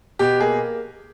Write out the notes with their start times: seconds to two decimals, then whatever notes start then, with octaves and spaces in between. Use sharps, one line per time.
0.19 B2 G4
0.40 A#3 G#4